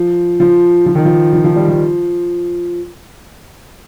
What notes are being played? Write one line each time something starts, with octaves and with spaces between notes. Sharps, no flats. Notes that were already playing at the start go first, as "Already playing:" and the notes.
Already playing: F3
F3
F3
D#3
F3
F3
F3
G3
F3